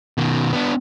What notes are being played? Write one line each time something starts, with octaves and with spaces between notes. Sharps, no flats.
B2 D#3
B3 D4